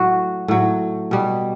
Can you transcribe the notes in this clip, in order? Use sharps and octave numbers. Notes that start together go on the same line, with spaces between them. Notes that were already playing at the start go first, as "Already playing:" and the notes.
Already playing: A2 F#3 F#4
A2 F#3
B2 G3